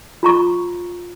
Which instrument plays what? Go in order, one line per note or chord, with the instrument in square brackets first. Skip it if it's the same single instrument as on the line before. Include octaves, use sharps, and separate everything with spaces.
[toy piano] F4 A#5 C#6